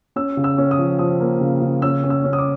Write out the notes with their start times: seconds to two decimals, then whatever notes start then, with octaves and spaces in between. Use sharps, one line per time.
0.16 C#4 E6
0.37 C#3
0.44 E6
0.58 C#4
0.71 D#6
0.78 F3
0.99 F3 D#6
1.20 A#3
1.41 C#3
1.62 C#3
1.82 C#4 E6
2.04 C#4
2.10 E6
2.24 C#4
2.33 D#6
2.38 D6